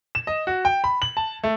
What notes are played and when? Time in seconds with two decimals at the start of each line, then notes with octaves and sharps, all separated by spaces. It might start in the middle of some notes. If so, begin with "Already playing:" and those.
0.15 E7
0.27 D#5
0.47 F#4
0.65 G5
0.84 B5
1.02 F#7
1.17 A5
1.44 A3